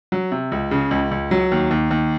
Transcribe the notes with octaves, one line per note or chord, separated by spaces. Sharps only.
F#3
C3
C#2
C#3
C#2
C#2
F#3
D#2
D#2
D#2